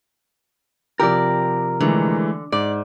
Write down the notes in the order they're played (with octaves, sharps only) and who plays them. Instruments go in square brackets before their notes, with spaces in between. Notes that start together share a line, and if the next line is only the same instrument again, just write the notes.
[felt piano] C3 F3 E6 [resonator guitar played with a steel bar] G4 D5 [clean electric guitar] A#4
[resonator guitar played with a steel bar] D3 [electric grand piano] E3 G#3 A3
[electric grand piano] G#2 [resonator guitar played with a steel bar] D5